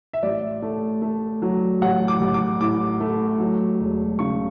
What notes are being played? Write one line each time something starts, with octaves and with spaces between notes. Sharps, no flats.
E5
A1 D5
A3
A3
F#3
A1 F#5
D6
A1
D6
A2 D6
A3
F#3
E1
C#3 C#6